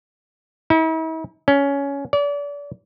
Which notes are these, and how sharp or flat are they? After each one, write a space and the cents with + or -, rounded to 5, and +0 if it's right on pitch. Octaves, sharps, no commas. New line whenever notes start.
E4 -45
C#4 +15
D5 -35